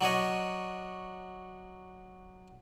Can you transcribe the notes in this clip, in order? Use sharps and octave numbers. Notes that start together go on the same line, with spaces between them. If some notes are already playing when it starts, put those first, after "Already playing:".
F#3 D4 C#5 D#5